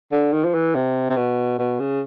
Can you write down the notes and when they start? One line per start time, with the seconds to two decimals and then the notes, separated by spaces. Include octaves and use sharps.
0.12 D3
0.33 D#3
0.44 F3
0.54 E3
0.75 C3
1.10 C3
1.16 B2
1.59 B2
1.80 C#3